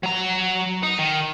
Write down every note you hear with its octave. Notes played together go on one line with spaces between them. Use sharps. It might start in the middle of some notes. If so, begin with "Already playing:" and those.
F#3 A#5
D#4
D#3